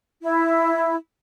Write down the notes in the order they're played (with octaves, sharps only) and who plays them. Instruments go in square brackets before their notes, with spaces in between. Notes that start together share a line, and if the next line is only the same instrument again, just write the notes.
[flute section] E4